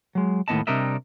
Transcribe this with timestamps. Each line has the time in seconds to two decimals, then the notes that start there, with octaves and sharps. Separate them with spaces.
0.15 F#3 G#3
0.48 D#2 A2 A#3 B3 D#5 A5
0.67 C3 G3 D4 A#4 D#5 E5